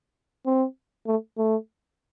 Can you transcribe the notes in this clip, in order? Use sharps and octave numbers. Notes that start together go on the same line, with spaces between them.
C4
A3
A3